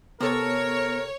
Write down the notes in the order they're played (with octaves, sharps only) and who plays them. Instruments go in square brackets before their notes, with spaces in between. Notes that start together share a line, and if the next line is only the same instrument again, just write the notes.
[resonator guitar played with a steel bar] C3 A4 [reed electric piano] B3 [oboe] A#4 [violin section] C#5